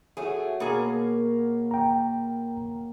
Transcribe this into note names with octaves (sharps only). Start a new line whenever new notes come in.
A3 F#4 G#4 C#5 C#6
B2 A#3 G#4 A#4 F5
G5 A#5